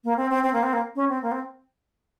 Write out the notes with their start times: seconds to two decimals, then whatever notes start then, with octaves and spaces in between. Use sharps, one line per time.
0.04 A#3
0.17 C4
0.30 C4
0.43 C4
0.53 A#3
0.63 C4
0.73 A#3
0.95 C#4
1.09 C4
1.22 A#3
1.31 C4